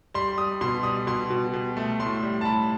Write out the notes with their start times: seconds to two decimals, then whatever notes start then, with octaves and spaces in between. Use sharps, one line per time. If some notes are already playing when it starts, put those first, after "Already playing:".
0.14 G3 C6
0.38 G3 D#6
0.61 B2 C6
0.83 G3 D#6
1.07 B2 C6
1.30 B2
1.53 B2
1.77 A3
2.00 A2 C6
2.23 G3
2.41 A5
2.45 A2 B5